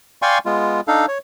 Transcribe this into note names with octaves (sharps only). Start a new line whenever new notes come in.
D5 F5 G5 G#5 C6 C#6
G#3 B3 F4
D4 D#4 A4 F5
C#5